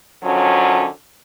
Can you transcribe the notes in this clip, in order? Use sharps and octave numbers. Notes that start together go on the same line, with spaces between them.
D3 D#3 F3 F#3 C#4